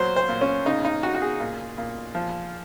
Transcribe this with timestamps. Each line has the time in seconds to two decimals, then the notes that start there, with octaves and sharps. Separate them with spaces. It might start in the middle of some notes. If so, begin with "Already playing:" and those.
Already playing: A#2 F#3 C5
0.16 C5
0.29 A#2
0.41 C#4
0.66 C#3 D#4
0.85 D#4
1.03 C#3 F#4
1.15 F#4
1.22 G#4
1.40 A#2
1.78 A#2
2.15 F3